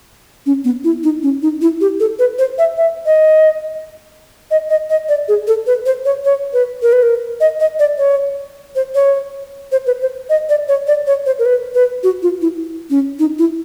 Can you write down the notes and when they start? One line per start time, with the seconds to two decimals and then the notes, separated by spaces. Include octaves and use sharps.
0.46 C#4
0.64 B3
0.84 E4
1.03 D#4
1.23 C#4
1.42 D#4
1.62 E4
1.81 G4
2.00 A4
2.19 B4
2.39 C5
2.58 E5
2.77 E5
3.06 D#5
4.51 D#5
4.70 D#5
4.90 D#5
5.09 D5
5.28 G#4
5.47 A4
5.67 B4
5.86 C5
6.05 C#5
6.25 C#5
6.53 B4
6.82 A#4
6.93 B4
7.03 A#4
7.41 D#5
7.60 D#5
7.79 D5
7.98 C#5
8.76 C5
8.95 C#5
9.72 C5
9.87 B4
10.01 C5
10.30 D#5
10.49 D5
10.68 C#5
10.87 D5
11.07 C#5
11.26 C5
11.39 A#4
11.45 B4
11.75 B4
12.03 F#4
12.22 F4
12.42 E4
12.90 C#4
13.19 D#4
13.39 E4